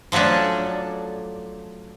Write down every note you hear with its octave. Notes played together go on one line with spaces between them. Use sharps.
F3 F#3 A3 C#4 D4